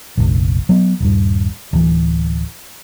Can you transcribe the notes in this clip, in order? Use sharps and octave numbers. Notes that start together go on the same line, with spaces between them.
F1 A#1
F#3 B3
D#1 G2
D1 E3